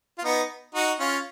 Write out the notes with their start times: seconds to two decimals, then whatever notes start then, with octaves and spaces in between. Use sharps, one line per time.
0.18 F4
0.25 B3 D#4
0.75 D#4 F#4
1.00 C#4 F4